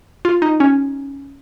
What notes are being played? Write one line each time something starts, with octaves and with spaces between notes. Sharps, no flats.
F4
D#4
C#4